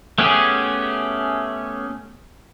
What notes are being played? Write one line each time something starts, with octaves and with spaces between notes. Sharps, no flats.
A3 B3 C#4 G4 G#4